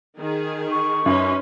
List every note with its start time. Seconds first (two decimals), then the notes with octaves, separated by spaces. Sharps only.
0.19 D#3 G#4
0.71 C#6
1.06 F#2 C#4 D#4 B4